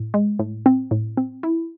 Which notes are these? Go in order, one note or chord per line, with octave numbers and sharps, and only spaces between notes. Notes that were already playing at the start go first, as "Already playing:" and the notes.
Already playing: A2
G#3
A2
C4
A2
C4
E4